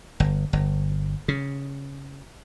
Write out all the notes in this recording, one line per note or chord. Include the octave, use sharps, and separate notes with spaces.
G1
G1
C#3